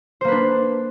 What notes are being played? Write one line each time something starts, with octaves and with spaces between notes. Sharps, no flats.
A#3 D4 B4 C5